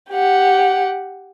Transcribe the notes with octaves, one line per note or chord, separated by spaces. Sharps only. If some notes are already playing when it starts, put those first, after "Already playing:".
G4 F#5